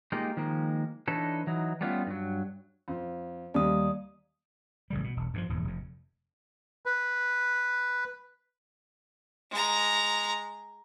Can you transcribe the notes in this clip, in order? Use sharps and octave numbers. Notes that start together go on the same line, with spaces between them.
G#3 A#3 D#4 F4 G4
D#3 F3 G#3 A#3
E3 D4 D#4 A4 B4 C#5
E3 F#3 D#4
G3 A3 B3 C#4 D#4 F4
G2 F#3
F2
D#2 G3 D5 D#6
A1 C#3 G3
B2
E1
G2 D#3 F3
D#1 E2 G#2
F1 F2
B4
G#3 A#5